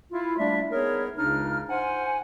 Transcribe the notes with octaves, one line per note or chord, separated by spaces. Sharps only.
E4 F4
G3 A3 A#3 D4 D5 E5
B3 D#4 G#4 A#4 C#5
C#2 C#3 D4 D#4 F6
C5 F#5 G#5